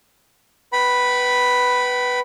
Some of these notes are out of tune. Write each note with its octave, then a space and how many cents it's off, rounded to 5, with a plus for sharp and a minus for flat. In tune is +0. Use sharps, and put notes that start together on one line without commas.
B4 +0 G5 -45 B5 +0